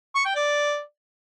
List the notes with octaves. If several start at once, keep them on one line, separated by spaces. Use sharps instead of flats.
C#6
G5
D5